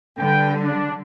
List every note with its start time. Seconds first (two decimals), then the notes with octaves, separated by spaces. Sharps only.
0.18 D3 G3 A4 B4 G5
0.63 D4